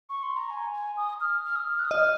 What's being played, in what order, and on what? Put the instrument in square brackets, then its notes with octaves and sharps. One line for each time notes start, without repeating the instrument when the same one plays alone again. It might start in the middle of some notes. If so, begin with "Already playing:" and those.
[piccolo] C#6
C6
A#5
G#5
G#5
D#6
F6
F6
D#6
F6
F#6
D#6
[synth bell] D#5 [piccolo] F6